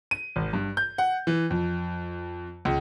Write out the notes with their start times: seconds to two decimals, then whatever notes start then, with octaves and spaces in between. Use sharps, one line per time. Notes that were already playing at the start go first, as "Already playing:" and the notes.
0.11 D#7
0.36 G#1
0.53 G2
0.77 G6
0.98 F#5
1.27 E3
1.50 F2
2.65 C#2